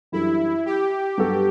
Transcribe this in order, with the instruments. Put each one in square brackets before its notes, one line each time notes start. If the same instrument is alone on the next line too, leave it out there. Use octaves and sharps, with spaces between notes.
[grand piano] F#2 E3 G3 D4 A4 [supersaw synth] E4
[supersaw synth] G4
[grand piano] G2 F#3 B3 F#4 A4